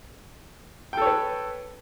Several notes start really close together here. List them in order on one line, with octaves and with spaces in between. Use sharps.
G5 A4 C#5 B4